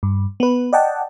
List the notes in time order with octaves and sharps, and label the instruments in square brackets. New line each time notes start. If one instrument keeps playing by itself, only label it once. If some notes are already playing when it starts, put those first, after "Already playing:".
[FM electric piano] G2
B3 B4
D5 D#5 F#5 G5 A5